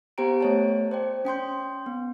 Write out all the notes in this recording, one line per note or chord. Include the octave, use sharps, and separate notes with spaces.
B3 G4 C5 G5 A#5 D7
A3 C#5 A5
C5 D5 G5
C#4 G5 C6 G6
B3